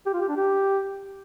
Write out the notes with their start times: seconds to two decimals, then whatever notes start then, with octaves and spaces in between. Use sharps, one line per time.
0.06 G4
0.14 F4
0.21 G4
0.29 D4
0.36 G4